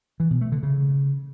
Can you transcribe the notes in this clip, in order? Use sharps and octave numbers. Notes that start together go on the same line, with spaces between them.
E3
B2
A3
D3
C#3